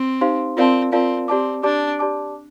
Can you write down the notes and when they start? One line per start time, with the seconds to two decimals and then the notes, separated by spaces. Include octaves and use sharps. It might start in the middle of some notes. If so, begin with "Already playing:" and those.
Already playing: C4
0.21 D#4 G4 C5 F5 C6
0.57 C4 F4 A#4 D5 F5 A5
0.92 C4 F4 A#4 D5 F5 A5
1.28 C4 G4 D5 A5 D6
1.63 D4 G4 D5 A5 D6
1.99 G4 D5 A5 D6